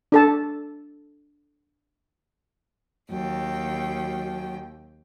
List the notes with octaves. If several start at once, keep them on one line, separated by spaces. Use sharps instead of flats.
D4 A4 A5
D#2 F#3 G5